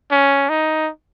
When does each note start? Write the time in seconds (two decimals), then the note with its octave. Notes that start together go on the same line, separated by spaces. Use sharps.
0.11 C#4
0.49 D#4